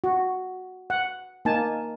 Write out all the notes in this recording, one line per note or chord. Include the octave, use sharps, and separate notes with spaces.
F#4
F#5
A#3 D#4 G#5 A5